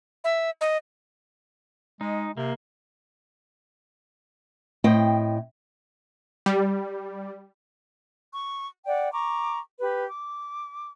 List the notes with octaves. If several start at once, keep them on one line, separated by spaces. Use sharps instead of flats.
E5
D#5
G#3 D#4
C3 A#3
A2 C4 D#5 G5
G3
C#6
D5 F#5 G5
A#5 C#6 D6
G4 B4
D6